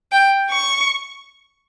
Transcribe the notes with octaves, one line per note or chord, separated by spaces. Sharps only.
G5
C#6